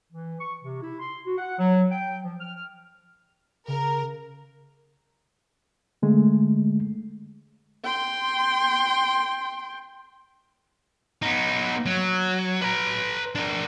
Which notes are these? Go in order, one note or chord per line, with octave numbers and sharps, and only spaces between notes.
E3
C#6
C3
E4
C6
F#4
F#5
F#3
G5
F3
F6
C#3 A#4
D3 G#3 A3
G5 C6
B3 D#4
F#3
B4 A#5
D4 A#4